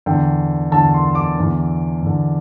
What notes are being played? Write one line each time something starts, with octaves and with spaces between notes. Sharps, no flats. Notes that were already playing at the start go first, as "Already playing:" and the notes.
E2 D3 G5
E2 D3 A5
C6
D6
E2 D3
E2 D3